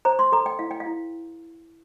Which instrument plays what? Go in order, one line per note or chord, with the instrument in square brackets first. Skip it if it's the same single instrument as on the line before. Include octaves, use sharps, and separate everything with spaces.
[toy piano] C5 A#5
C6
A4 A#5
G5
E4 F5
G5
F5
E4